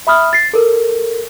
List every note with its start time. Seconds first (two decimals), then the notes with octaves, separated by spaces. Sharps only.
0.07 E5 B5 D#6 F6
0.33 A6 C7
0.54 A4 A#4